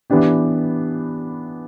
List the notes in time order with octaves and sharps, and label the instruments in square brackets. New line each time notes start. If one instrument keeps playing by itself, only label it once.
[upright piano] E3 B3 D4 G4